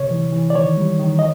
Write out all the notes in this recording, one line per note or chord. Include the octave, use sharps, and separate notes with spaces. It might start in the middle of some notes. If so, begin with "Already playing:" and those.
Already playing: C3 C#5
E3
E3
D5
D#3 C#5
G3
D#3
D#5